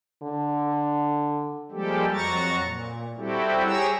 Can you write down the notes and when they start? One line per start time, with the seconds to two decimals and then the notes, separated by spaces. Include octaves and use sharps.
0.22 D3
1.71 F3 G3 G#3 A#3 G4 A4
2.13 F2 F#3 F#4 A#5 C#6 A6
2.60 A#2
3.17 G3 C4 E4 F#4 G4 A4
3.65 G4 G#4 C#5 A#5 E6